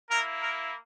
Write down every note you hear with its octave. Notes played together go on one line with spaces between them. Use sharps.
A#3 E4 A#4
A#4